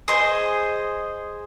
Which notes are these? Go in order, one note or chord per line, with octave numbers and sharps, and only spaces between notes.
G#4 C5 D#5